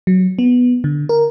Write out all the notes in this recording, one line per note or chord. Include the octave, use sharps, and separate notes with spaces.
F#3
B3
D3
A#4